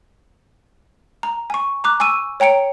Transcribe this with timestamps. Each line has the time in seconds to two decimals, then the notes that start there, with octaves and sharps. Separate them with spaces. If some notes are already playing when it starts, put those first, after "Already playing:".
1.23 A#5
1.50 G#5 C#6
1.84 A#5 D6 F#6
2.00 G#5 C#6 E6 D#7
2.40 C#5 G5 A#5 C#7 D7